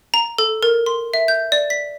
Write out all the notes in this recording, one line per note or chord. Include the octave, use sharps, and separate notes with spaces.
A#5
A4
A#4
C6
E5
G6
D5
B6